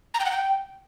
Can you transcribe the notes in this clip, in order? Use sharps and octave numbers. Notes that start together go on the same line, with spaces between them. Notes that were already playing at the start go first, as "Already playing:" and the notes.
A#5
G5
F#5
G5